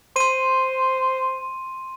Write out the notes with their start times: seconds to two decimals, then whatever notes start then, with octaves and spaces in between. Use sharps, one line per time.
0.16 C5 C6 D#7